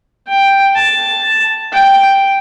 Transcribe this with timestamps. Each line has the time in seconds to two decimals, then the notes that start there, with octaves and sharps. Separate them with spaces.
0.28 G5
0.76 A5
1.73 G5